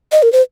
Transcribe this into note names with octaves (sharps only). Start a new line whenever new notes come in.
D#5
A#4
C5